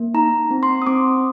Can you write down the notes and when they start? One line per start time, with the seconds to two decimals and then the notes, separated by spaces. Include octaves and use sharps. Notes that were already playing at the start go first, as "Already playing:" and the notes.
Already playing: A#3
0.14 D#4 A#5
0.51 C4
0.63 C6
0.82 D#6
0.87 C4 D6